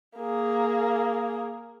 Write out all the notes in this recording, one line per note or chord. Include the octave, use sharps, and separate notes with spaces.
A#3 G#4